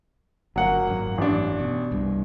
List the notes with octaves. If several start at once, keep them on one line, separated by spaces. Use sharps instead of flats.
G1 F#3 A#3 F#5
G#1 F#2
A1 D4
B2
C2 G2